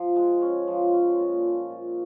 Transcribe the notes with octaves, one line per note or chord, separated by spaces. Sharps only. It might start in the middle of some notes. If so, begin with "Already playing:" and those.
Already playing: F3
G#3
C#4
F3
C#4
A#2
A#2
A#2